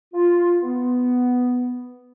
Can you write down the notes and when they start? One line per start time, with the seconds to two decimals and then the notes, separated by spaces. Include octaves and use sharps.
0.14 F4
0.62 B3